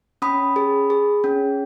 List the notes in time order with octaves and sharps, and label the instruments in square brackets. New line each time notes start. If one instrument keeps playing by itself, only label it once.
[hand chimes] C#4 B5 D#6
G#4
G#4
C#4